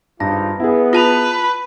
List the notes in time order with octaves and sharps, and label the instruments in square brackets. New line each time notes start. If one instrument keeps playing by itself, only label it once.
[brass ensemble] G#1 D#4 F4 [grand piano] G2 [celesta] A#6
[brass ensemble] B3 [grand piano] E4 G#4
[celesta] F4 A5 F7 [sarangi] B4